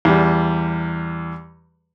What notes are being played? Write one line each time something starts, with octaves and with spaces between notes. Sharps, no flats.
E2 G3